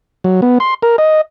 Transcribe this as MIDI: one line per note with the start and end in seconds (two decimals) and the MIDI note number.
0.24 0.41 54
0.42 0.58 59
0.60 0.74 84
0.83 0.96 70
0.98 1.21 75